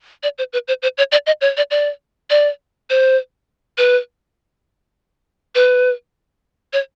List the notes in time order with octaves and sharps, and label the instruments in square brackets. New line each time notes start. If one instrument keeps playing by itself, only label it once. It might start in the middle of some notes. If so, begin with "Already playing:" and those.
[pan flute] D5
C5
B4
C5
C5
C#5
D5
D#5
C#5
D5
D5
D5
C5
B4
B4
C#5